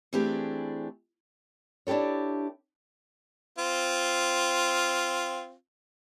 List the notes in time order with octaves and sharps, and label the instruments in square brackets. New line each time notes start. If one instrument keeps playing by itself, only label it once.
[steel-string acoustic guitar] E3 A3 C4 D4 G4 G#4
[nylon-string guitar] D4 E4 G4 A4 C#5
[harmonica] C4 F4